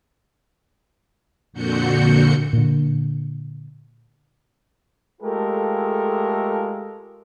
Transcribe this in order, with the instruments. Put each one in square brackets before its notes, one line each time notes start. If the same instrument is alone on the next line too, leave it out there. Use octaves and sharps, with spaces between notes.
[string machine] F2 A#2 D3 F#4 G6 C#7
[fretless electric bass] A#2 D3
[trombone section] G#3 A3 F4 G4 A4 A#4